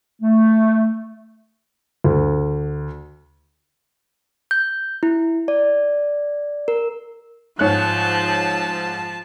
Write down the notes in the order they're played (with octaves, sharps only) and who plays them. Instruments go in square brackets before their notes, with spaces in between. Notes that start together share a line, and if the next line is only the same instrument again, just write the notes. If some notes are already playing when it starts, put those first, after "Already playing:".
[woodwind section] A3
[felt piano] D2
[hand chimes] G6
E4
D5
A#4
[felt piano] G#2 C#5 F#6 [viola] F3 A5